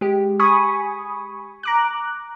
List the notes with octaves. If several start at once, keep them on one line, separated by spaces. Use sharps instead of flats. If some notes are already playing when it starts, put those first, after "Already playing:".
G#3 G4
G#5 B5 C#6 D#6
A#5 D6 F#6